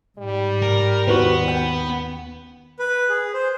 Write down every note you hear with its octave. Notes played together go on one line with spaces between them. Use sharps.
G#2 G3
A#4
D#2 B3 F#4 B4 C5
G5
B4
G#4
C5